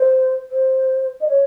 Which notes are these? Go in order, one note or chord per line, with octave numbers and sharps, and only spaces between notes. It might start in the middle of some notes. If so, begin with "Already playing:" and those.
Already playing: C5
C5
D#5
C#5